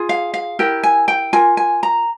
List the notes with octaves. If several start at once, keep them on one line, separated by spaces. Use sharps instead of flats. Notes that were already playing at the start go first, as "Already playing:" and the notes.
Already playing: F4 G#4
F5
F5
E4 G4 A#4 G5
G#5
G5
F4 A#4 G#5
G#5
A#5